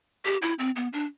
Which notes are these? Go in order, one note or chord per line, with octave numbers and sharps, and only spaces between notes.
G4
E4
C4
B3
D4